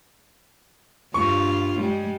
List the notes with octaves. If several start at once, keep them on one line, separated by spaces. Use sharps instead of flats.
G2 F4 C#6
G3 G#3